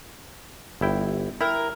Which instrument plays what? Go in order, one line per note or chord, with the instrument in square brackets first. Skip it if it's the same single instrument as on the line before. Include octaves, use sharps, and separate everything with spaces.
[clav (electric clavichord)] G1 E4 G5
[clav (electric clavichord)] E4 G5 [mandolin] A#4